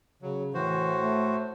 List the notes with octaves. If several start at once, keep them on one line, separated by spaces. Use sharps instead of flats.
C#3 F#3
A2 E3 F#4 C5
A3